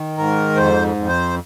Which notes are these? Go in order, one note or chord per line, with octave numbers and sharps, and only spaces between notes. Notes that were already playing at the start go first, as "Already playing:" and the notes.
Already playing: D#3
G#2 A#4
F2 C5
F2
C5